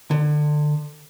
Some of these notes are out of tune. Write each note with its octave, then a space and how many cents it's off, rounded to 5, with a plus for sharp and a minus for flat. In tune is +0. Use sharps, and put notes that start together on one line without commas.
D3 +25